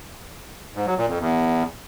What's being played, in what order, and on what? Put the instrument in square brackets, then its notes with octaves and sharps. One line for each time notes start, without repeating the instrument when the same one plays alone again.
[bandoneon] G#2
F#3
A#2
F2
E2